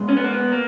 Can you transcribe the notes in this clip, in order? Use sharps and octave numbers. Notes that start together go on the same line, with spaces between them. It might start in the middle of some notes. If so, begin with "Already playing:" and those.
Already playing: B2 G#3
C#4
B3
A#3
B3
A#3